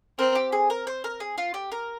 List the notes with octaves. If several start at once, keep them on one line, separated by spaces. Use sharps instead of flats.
C4 A#4
G4
G#4
A#4
C5
A#4
G#4
F4
G4
A#4